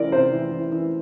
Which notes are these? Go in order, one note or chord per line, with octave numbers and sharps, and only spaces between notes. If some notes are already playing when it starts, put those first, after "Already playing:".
Already playing: C3 E3 A#4 D5
C3 C5
E3
E3
E3